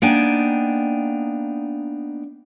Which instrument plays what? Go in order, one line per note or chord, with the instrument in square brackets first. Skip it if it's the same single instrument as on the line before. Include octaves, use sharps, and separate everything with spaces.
[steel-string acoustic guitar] A#3 B3 D4 D#4 G5 G#5